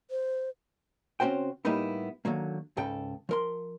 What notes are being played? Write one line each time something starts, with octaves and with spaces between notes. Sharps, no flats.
C5
C#3 C4 C#4 F#4 C5 G5
A2 G3 A#3 B3 D#4 E4
D3 D#3 F#3 A#3
C#2 G#2 C#3 A4 G5
F3 A#4 C6